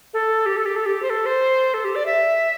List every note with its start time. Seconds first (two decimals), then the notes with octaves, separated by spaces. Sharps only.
0.14 A4
0.46 G4
0.56 A4
0.66 G4
0.76 A4
0.86 G4
1.02 C5
1.10 A4
1.26 C5
1.74 A4
1.84 G4
1.95 D5
2.06 E5